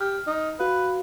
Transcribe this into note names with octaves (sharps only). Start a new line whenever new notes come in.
G4 F6
D#4
F#4 B4 F5